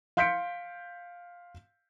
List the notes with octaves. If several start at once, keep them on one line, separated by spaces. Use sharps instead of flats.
F5 C6 G6 B6 C#7 D7